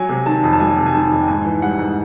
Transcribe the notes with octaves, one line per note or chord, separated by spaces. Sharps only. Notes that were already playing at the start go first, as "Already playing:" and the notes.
Already playing: F#3 G#5
C3
D#3 A5
F2
A5
F#3 G#5
C3
G#5
D#3 A5
F2
G5
G#2 G#5
E3
G3 F#5
G#2